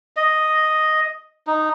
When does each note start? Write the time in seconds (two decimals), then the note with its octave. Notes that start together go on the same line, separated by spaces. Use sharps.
0.17 D#5
1.47 D#4